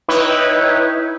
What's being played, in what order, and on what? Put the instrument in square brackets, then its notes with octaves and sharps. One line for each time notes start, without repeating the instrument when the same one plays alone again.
[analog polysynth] D#4 E4 B4 C#5 G5